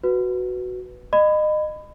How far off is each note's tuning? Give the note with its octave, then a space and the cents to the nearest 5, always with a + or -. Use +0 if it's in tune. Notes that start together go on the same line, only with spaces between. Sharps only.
F#4 +0 B4 +0
D#5 -25 B5 +20